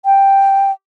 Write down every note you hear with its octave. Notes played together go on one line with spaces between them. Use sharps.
G5